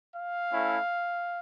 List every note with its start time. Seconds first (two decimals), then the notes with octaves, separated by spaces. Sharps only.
0.14 F5
0.51 A3 C#4 E4